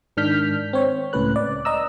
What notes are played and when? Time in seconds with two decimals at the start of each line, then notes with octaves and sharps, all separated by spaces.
0.17 G#2 D#3 D4 F6 G6 B6
0.73 C4 C#5
1.13 C#2 A2 C#4 B4 F#6
1.36 D5
1.65 D#5 A#5 E6